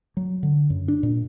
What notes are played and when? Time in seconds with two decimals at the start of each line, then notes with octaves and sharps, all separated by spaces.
0.17 F#3
0.43 D3
0.70 F#2
0.88 D4
1.03 A#2